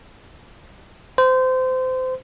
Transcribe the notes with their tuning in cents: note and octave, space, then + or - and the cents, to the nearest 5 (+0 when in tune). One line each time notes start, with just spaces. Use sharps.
C5 -25